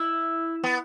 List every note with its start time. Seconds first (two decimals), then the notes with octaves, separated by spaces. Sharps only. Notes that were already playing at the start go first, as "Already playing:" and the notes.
Already playing: E4
0.64 B3